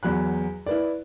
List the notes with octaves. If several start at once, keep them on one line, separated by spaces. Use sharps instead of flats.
E2 F#3 B5 F#6
E4 B4 D5